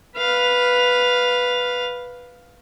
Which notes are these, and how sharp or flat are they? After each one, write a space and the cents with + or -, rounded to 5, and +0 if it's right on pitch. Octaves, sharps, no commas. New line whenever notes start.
B4 +0 F5 +5